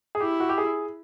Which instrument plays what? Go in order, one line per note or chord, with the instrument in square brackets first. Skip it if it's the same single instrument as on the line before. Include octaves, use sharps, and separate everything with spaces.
[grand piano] G#4
[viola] E4 [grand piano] G4
[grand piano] F#4
G4
G#4